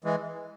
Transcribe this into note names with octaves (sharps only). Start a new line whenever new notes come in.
E3 G#3